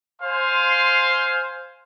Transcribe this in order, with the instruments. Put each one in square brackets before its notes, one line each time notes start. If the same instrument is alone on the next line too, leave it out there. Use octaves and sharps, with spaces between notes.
[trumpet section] C5 F5 G#5 C6